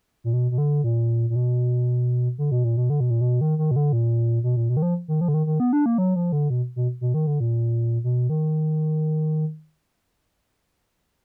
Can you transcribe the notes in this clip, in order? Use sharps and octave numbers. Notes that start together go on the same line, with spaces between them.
A#2
B2
B2
D3
A#2
A#2
B2
D3
B2
A#2
B2
D3
B2
A#2
B2
D#3
D#3
B2
D3
A#2
B2
A#2
B2
D#3
F3
D#3
F3
D3
D#3
D#3
B3
D4
A#3
F#3
F3
D3
B2
B2
B2
D#3
D3
A#2
B2
D#3